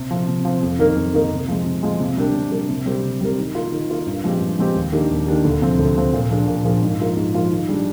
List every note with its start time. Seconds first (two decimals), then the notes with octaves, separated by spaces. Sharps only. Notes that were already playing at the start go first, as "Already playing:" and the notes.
Already playing: C3
0.11 F3 C4
0.28 C3
0.45 F3 C4
0.63 F2
0.79 D#3 A#3 D#4 A#4
0.96 F2
1.14 D#3 A#3 D#4 A#4
1.31 C3
1.48 F3 G#3
1.65 C3
1.83 F3 G#3
2.00 C3
2.17 G3 D4 G4 A#4
2.34 C3
2.52 G3 D4 G4 A#4
2.69 C3
2.86 G3 C4 G4 A#4
3.04 C3
3.21 G3 C4 G4 A#4
3.38 D#3
3.55 A#3 F4 A#4
3.72 D#3
3.89 A#3 F4 A#4
4.06 G2
4.24 F3 G#3 C4 G4
4.41 G2
4.59 F3 G#3 C4 G4
4.76 D#2
4.92 D#3 A#3 D4 G4
5.10 D#2
5.27 D#3 A#3 D4 G4
5.45 D2
5.61 C3 F3 C4
5.79 D2
5.96 C3 F3 C4
6.13 A#2
6.30 F3 A#3 D4 G#4
6.48 A#2
6.65 F3 A#3 D4 G#4
6.82 G#2
7.00 F3 A#3 F4 A#4
7.17 G#2
7.34 F3 A#3 F4 A#4
7.51 D#3
7.68 G3 D4 G#4